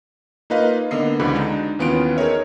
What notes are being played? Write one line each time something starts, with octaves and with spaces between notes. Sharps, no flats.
A#3 D#4 F4 B4 D#5 F5
D3 A#3 B3 D#5 C7
C#2 D3 E3 C4 F#4 B5
G#3 D4 D#4
D#2 E3 B3 C#4 F4 D7
D#4 G#4 A#4 C#5 E5